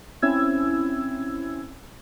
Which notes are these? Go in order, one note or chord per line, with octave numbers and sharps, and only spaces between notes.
C4 C#4 E4 E6 G#6